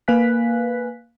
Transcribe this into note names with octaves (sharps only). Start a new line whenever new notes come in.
A#3 B4 F5 G#5 F#6 B6